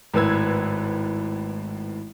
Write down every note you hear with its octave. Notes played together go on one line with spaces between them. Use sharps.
G#1 A2 B4 E6 G#6